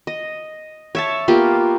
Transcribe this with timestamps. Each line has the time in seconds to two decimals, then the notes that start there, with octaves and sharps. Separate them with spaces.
0.07 D#5
0.95 C#5 E5 A5
1.28 A#3 B3 F4 G4